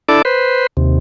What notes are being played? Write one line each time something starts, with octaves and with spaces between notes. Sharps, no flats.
D4 E4 A4 D5
B4 C5
D#2 C3